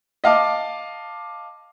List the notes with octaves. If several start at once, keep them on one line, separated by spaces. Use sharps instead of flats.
D#5 F5 A5 D6